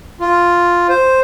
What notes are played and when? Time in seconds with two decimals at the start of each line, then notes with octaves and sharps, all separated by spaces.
0.21 F4
0.89 C5